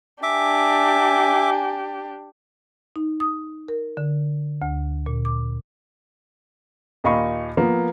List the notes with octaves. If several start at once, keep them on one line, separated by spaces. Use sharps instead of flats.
D4 G4 E5 G#5 D6
D#4
D#6
A#4
D3
D2
A#2
D6
D#2 A#2 D#5 F5 B5 C#6
F3 A#3 B3